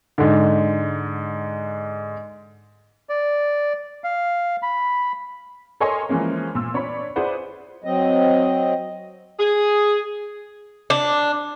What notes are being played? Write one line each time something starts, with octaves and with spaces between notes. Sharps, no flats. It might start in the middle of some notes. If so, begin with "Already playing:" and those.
G#2 D3
D5
F5
B5
A4 A#4 C#5 D#5 G#5 C6
E3 F3 G#3 A#3 C#4
A#2 E6
D4 C#5 D5 B5
E4 G#4 B4 C5 D5 F#5
F#3 C4 D#5
G#4
D4